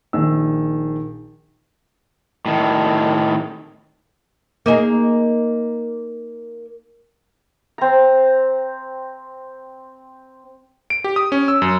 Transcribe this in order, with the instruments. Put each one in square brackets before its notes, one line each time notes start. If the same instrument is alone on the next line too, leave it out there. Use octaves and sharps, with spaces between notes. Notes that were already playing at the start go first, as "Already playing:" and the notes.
[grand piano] A#1 D#3 E6
[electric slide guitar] A2 D#3
[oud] A#3 D#4 G#4
[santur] C4 A#5
[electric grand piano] D7
G4
D#6
C#4
E6
F#2